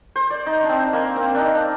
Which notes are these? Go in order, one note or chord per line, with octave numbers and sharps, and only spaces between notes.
C5
D5
D#4
D4
C4
A#3
C4
D4 D#4
D4